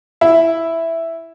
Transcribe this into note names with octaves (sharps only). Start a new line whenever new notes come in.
E4